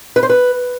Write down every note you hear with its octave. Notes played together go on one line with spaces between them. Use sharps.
B4
C5
B4